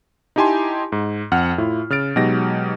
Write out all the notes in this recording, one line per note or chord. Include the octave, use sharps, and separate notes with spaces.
D#4 E4 G4 G#5 A5 C6
G#2
F2 F#5 F6
A2 E4 F4
C#3 F6 A6 D7
B2 F#3 G#3 D#4 G4 A#6